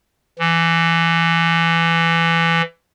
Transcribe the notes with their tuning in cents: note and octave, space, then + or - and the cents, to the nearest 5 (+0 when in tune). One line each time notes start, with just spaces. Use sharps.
E3 +20